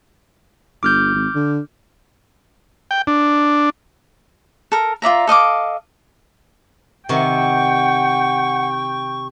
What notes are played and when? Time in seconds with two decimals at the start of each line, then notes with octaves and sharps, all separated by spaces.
0.83 G1 D6 F6 G6
1.14 G#1
1.35 D3
2.91 G5
3.07 D4
4.72 A4 A#4
5.02 F4 D5 E5 A#5
5.27 A4 D#5 F5 D6
7.09 C3 D#3 F#5 G5 C#6